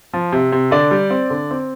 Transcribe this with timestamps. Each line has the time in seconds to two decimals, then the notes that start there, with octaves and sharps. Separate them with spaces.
0.13 F3
0.32 C3
0.52 C3
0.71 D3 D5
0.91 G3
1.10 C4
1.30 D3
1.51 C4